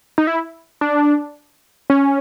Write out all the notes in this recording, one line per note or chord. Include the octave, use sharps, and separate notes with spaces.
D#4
E4
D4
C#4